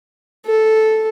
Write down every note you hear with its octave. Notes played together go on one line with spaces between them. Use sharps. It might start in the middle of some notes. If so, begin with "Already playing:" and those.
A4